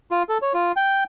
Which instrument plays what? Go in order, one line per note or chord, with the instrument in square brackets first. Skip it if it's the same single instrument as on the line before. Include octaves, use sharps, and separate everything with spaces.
[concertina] F4
A4
C#5
F4
G5